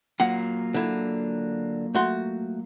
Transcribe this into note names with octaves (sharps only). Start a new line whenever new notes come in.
F#3 A#3 F4 F#5
D3 E4
A3 F#4 C6